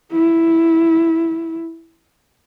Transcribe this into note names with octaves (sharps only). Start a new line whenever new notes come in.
E4